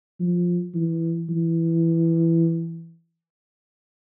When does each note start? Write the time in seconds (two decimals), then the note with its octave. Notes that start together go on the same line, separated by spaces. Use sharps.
0.20 F3
0.74 E3
1.29 E3